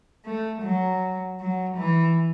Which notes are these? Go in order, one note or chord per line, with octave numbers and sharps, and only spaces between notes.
A3
F#3
F#3
E3